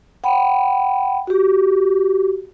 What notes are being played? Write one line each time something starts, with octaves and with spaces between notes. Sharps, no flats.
F#5 G5 B5
F#4 G4